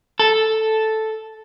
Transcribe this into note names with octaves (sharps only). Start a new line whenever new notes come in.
A4